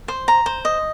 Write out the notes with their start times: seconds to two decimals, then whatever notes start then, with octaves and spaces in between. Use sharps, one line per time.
0.08 C5
0.28 A#5
0.46 C5
0.65 D#5